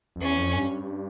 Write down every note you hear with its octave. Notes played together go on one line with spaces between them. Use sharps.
F2
E2 C#4
F2
G2